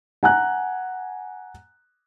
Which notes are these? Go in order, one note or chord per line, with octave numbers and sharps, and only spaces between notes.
F#5 G#5 A#5 F#6